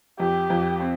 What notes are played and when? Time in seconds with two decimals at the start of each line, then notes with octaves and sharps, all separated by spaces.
0.19 F2 G4
0.50 F2
0.80 C4